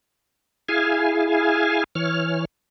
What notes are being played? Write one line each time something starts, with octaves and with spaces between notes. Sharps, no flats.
E4 G#4 F5 G#5
E3 C#5 F6